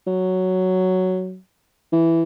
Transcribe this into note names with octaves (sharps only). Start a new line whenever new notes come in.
F#3
E3